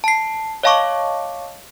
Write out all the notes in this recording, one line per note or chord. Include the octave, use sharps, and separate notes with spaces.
A5 C7
C#5 D#5 F5 A5 C#6 D6